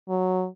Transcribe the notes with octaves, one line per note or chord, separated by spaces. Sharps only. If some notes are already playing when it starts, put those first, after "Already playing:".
F#3